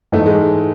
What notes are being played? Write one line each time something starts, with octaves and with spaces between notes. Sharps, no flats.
G#2 E3 A3
G#3